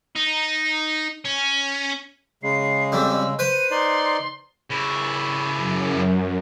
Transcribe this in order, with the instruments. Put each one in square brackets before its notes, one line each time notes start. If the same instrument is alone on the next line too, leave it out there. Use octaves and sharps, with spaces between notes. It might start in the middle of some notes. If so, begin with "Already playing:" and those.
[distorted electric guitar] D#4
C#4
[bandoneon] C#3 G#3 [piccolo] C7
[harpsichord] F2 G3 [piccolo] E6
[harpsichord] B4 C5 [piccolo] D#7
[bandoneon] D#4 D5 [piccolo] C6
[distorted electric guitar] C#3 E4
[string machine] F#2